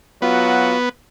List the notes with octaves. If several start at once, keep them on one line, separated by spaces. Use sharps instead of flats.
F#3 B3 F4 F#4